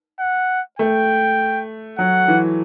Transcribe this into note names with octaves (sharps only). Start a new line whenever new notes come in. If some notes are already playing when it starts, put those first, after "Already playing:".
F#5
A3 G5
F#3 F#5
E3